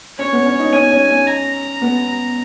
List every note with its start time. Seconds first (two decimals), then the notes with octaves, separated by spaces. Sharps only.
0.18 C#4 C#5
0.33 B3
0.46 C#4
0.59 D#4
0.73 C#4 G#5
0.91 C#4
1.10 C#4
1.28 A#5
1.82 B3